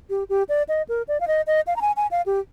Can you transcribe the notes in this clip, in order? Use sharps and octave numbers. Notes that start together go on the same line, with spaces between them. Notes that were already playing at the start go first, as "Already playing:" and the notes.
G4
G4
D5
D#5
A#4
D5
F5
D#5
D#5
F5
A#5
G#5
G#5
F5
G4